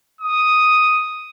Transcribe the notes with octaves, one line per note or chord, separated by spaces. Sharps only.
D#6